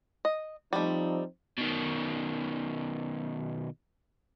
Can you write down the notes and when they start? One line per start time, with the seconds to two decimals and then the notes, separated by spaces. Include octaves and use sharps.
0.25 D#5
0.73 F3 G3 A3 C4 D#4
1.58 B2 D#3